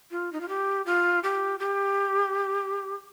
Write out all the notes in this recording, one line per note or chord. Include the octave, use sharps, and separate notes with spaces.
F4
D#4
F4
G4
F4
G4
G4